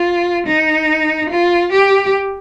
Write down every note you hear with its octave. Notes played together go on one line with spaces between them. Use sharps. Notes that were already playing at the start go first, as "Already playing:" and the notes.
Already playing: F4
D#4
F4
G4